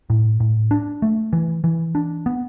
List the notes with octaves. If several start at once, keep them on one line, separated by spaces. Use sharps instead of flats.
A2
A2
D4
A3
E3
E3
D4
B3